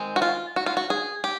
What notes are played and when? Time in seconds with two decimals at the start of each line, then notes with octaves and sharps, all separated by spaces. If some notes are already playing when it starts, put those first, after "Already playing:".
Already playing: D#3 G#3 C4
0.16 F#4
0.22 F4
0.56 F#4
0.66 F4
0.77 F#4
0.90 G#4
1.24 G4